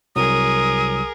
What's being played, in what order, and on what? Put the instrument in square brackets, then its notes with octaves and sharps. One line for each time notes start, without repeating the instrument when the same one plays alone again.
[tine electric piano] C2 F#3 [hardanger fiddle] G#4 A#4 [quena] D#6